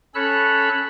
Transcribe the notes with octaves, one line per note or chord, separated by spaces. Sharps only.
C#4 A4 C#5 B5 E6 F#6